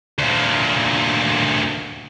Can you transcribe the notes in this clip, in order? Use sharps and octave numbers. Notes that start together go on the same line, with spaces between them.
D2 A#2